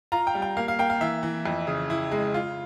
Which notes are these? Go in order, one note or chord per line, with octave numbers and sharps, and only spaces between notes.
F4 A#5
G5
G3
G5
A#3 F5
F5
A#3 G5
F5
E3 E5
E3
F2
C#3
E4
G#3
F4